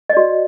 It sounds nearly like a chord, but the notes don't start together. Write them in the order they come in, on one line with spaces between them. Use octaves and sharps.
D#5 D5 F#4